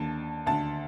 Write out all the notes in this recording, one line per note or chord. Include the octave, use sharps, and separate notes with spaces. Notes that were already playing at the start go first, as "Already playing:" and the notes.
Already playing: D#2 D3 A5
D2 D3 A5